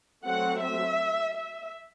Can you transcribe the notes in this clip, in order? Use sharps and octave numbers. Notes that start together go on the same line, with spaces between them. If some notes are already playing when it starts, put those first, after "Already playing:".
F#3 A3 C4 F#5
E5
E5